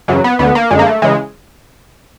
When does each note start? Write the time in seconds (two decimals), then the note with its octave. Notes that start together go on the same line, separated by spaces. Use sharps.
0.08 F#2 C#3 E3 F#3
0.24 B3
0.39 D2 D3 B3
0.55 A#3
0.70 F#2 D3 G#3
0.79 A#3
0.86 A3
1.02 C#3 E3 G#3